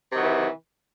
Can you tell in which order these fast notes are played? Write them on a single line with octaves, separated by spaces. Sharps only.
C3 D#3 F#3 E3